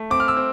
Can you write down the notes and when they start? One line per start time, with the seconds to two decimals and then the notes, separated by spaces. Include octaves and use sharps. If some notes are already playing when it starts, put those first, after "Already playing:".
Already playing: A3
0.10 C4 D6
0.20 F6
0.28 E6
0.37 C4